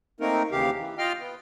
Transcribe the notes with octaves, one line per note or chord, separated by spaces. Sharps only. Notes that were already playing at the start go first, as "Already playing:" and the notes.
A3 A#3 C4 D#4 A#4
D#2 C#3 E3 G4 F5
E3
F4 D#5 F5 G5 F6
B3